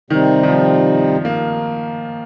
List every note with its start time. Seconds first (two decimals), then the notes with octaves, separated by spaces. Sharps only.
0.10 C3 D#3 G3 C4 D#4
0.43 D#3
0.48 F3
1.25 A#3